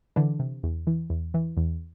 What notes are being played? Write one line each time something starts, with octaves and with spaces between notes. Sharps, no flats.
D3 E3 D4
C3
E2
E3
E2
E3
E2